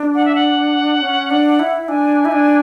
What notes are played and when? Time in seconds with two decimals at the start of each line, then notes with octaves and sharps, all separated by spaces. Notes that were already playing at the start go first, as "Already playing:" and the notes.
Already playing: D4
0.15 F#5
0.25 E5
0.35 F#5
1.01 C#4
1.31 D4
1.59 E4
1.88 D4 G#5
2.25 E4
2.31 D4